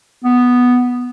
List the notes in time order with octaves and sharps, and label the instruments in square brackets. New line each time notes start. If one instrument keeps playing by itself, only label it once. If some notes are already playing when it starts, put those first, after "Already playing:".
[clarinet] B3